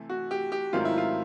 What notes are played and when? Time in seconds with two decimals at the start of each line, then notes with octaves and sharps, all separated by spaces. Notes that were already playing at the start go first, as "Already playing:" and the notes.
Already playing: C3 E3 A3
0.10 F#4
0.31 G4
0.52 G4
0.73 G#2 D#3 F#3 A3 C4 F4
0.85 E4
0.98 F4